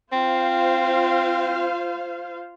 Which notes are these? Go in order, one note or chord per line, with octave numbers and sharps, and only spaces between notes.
C4 F4 C5 F5